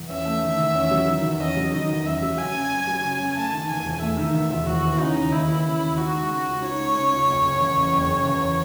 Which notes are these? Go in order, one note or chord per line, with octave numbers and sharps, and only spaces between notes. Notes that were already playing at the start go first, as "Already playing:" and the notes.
Already playing: E2
C#4 E5
A3
D#3
E2
C#4
F#3
D#3
E2
C#4 D#5
F#3
D#3 D#5
E2
F#2 E5
F#3
C#3 G#5
F#2
F#2
F#3
C#3
F#2
A3 A5
D#3
E2 G#5
E1
A3 E5
D#3
E2
E1
D#2 F#4
E3
C#3 D#4
D#2
D#2 E4
E3
C#3
D#2
D#4 F#4
G#3
C#3
C#2
D#4 C#5
G#3
C#3
C#2
F#1
C#3
E2
F#1
F#1
C#3
E2